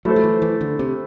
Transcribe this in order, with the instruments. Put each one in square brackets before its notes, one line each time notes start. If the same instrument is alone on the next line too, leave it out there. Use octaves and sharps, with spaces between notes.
[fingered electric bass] F#3 [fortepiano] A3 E4 A4 C5
[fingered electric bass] F#3
E3
E3
D3
C3